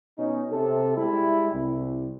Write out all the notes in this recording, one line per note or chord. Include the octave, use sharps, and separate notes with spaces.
B2 C#4 D#4
C3 A4
G3 G#3 E4
C2